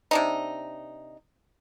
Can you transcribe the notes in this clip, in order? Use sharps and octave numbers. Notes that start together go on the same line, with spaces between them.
C3 D4 D#4